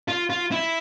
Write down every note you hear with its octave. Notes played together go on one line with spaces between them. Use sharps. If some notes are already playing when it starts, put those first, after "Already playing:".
F4
F4
E4